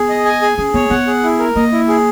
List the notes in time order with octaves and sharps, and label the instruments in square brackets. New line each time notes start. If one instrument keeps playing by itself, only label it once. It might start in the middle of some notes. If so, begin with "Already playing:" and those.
Already playing: [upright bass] B3 [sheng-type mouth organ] G#4
[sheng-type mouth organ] D#5
G#5
G#4
[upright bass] C#4 [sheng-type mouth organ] G#4
[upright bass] B3 [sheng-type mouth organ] C#5
[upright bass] B3 [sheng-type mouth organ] F#5
[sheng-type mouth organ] G#4
E4
A#4
[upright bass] A#3 [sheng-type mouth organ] D#5
[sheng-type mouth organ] E4
G#4